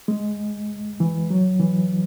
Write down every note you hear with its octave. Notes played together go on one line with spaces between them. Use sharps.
G#3
E3
F#3
E3